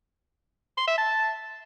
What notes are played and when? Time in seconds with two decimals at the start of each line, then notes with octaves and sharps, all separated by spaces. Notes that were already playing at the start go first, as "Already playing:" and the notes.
0.78 C6
0.88 E5
0.98 A5